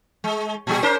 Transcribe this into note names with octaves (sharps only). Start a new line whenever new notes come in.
G#3
A#2 G3 G#4
C#4 A#4 C5